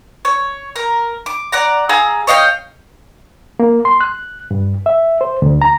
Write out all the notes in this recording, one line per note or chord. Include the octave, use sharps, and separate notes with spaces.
C#5
A#4
D6
D5 F#5 A#5
G#4 F5 A#5 E6
C#5 D#5 F5 G5
A#3
C6
F#6
G2
E5
C5
D2
A#5